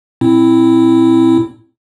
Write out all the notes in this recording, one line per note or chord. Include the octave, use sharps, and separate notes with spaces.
A#2 C4 E4